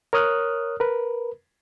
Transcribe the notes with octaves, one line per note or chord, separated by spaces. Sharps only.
A#4 C#5 D#6 F6 F#6
A#4 B4